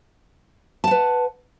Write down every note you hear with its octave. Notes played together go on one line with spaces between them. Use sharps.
B4 F#5 A5